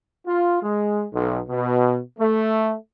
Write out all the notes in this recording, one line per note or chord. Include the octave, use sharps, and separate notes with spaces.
F4
G#3
B1
B2
A3